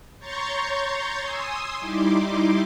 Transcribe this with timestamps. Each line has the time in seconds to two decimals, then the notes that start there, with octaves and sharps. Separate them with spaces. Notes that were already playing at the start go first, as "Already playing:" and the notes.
0.19 C#5 A#5 C6 C#6 G6 A6
1.23 G#5 C6 D#6 E6
1.79 G3 D#4 E4 C6 D6